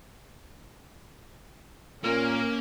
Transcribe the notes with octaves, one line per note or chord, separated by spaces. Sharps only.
A#2 A#3 C#4 A#4